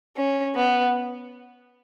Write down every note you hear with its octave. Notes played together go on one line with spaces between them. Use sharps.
C#4
B3